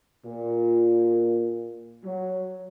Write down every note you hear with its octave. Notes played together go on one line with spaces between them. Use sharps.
A#2
F#3